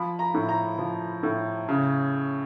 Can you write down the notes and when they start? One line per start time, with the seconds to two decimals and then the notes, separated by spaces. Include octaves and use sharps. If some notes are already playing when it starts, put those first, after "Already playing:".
Already playing: F3 B5
0.19 A#5
0.34 A2
0.49 A#5
0.78 F3
1.23 A2
1.68 C#3